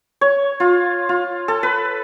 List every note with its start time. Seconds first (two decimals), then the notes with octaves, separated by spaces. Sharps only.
0.21 C#5
0.60 F4
1.09 F4
1.48 A4
1.63 B4